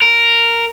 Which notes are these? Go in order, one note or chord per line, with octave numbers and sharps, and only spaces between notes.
A#4